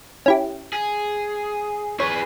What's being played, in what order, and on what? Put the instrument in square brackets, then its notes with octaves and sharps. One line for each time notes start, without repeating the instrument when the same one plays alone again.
[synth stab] C#4 E4 G4
[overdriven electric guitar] G#4
[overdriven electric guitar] G#4 B4 [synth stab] C#5